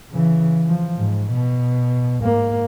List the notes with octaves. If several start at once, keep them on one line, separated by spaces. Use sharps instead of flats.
C#3 E3
F3
G#2
B2
G#2 A#3